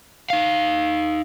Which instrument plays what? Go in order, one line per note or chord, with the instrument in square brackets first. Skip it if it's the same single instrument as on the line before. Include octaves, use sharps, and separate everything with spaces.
[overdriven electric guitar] D#4 F5